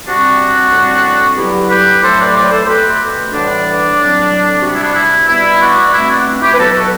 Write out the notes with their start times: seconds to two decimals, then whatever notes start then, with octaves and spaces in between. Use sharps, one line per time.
0.06 C3 G3 C4 D4 F#4
0.72 A2 G3 C4
1.37 D3 F#3 B3 E4 G4
1.69 G4 B4
2.02 A2 F#3 A3 C4 A4 C5
2.19 B4 D5
2.34 B4 D5
2.51 A4 C5
2.64 C5
2.67 B2 A3 C4 G4 B4
3.32 A2 E3 G3 B3 D4
3.97 A2 F#3 C4
4.62 C3 G3 B3 F#4
4.73 E4
4.82 D4
4.92 E4
5.28 B2 G3 B3 E4
5.59 D4 F#4
5.92 B2 A3 C4 E4
6.09 D4 F#4
6.41 E4 G4
6.54 B4
6.58 B2 F#3 B3 F#4 A4
6.73 F#4 A4